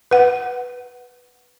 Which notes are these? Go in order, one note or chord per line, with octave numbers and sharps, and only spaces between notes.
B4 F#5